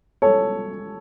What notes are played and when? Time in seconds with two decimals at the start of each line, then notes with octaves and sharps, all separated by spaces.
0.22 A4 C#5